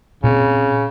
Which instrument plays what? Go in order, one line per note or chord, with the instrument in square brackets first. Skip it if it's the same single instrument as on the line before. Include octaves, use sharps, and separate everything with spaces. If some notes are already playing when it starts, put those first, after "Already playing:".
[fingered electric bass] A#2 C4 [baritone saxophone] C#3